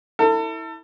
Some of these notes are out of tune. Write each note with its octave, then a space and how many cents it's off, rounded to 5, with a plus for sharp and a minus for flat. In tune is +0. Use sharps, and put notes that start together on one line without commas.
E4 -20 A4 +35